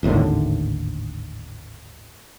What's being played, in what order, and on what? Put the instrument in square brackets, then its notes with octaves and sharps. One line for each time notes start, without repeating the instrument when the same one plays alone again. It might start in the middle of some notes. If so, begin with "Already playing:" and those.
[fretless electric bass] G#1 D#2 A2 D3